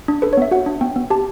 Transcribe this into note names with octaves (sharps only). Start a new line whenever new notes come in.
D4
A4 B4
C#5
B3 E5
F#4 F#5
D4
B3 G5
B3
G4 A5